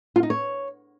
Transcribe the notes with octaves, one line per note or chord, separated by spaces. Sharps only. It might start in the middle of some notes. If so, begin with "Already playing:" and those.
F4
D#4
C#5